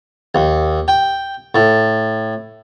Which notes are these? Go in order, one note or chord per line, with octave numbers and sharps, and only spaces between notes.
D#2
G5
A2